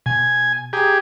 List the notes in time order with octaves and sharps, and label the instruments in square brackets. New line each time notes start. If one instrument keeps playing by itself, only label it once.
[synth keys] B2 [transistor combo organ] G#5
[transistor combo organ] G4 G#4 [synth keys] A#5 D#6